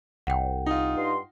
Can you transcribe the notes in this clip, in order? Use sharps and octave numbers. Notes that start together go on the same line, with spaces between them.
C2 F#5 G5
D#4 F4
G2 D#5 C6